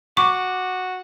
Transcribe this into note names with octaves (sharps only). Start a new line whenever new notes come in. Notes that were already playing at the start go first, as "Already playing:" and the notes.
F#4 C#6 D6